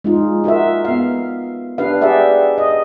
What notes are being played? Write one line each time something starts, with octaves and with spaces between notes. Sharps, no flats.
G#3 D#4 F4
F4 F#4 A#4 E5
B3 F5
D4 G4 B4 F5
G4 G#4 D5 E5 F#5
D#5